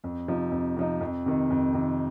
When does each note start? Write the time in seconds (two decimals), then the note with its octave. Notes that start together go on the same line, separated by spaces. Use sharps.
0.04 F2
0.28 C3 F3 D#4
0.52 F2
0.76 C3 F3 D#4
1.01 F2
1.26 C3 D#3
1.50 F2
1.74 C3 D#3